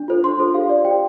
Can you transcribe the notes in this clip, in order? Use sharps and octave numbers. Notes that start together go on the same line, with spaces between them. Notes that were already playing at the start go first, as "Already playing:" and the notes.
Already playing: D4
F4 A4 C5
D4 C6
F4 A4 C5
G4 F5
D5
G4 G5